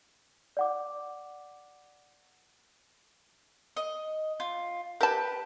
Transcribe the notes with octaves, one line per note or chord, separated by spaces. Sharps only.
D5 F#5 D6
D#5
F4
G4 A#4 B4 A5